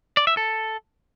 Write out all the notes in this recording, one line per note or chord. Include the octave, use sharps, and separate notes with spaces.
D5
E5
A4